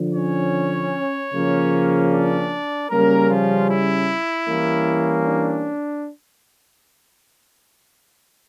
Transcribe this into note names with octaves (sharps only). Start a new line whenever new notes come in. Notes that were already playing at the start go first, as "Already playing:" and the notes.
Already playing: D3 F3
C#4 C#5
C#3 F3 A#3 C#4
D4 D5
C#3 G3 A#3 C#4 A#4
F3 F4
E4
E3 G3 A#3 C#4
D4